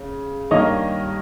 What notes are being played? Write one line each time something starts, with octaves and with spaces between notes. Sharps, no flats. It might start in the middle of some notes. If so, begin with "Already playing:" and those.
Already playing: C#3
G2 D#3 G3 A#3 C#5 D#5